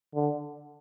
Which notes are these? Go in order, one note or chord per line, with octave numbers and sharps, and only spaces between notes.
D3